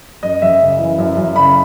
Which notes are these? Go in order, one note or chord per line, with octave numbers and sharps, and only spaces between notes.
F#2 D#5
F#2 E5
C#3
E3
F#2
F#2
C#3 B5